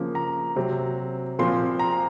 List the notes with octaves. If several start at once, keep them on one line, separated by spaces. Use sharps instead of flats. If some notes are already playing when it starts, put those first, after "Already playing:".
Already playing: C#3 F3 A#3
A#5
C3 F#3 C4
A#2 F3 C4 C6
A#5